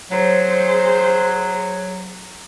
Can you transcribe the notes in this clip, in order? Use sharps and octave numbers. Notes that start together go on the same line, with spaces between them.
F#3 G#4 C5